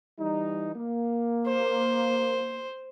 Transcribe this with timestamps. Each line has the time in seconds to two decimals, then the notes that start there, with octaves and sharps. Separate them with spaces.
0.19 E3 G3 D#4
0.76 A#3
1.47 C5